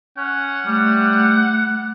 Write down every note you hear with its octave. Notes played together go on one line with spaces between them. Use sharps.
C#4 F#5
G3 A3